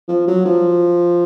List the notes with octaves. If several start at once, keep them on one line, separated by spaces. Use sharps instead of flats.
F3
F#3
F3